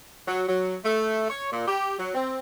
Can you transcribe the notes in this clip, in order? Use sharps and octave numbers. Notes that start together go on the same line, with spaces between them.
F#3
F#3
A3
C#5
A#2
G4
F#3
C4